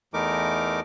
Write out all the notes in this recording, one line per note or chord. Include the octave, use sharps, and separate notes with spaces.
E2 E3 A3 D#4 A#4 D6